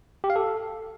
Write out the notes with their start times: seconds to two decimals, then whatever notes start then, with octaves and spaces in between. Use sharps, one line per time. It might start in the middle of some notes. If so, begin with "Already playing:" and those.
0.24 G4
0.30 F5
0.36 A4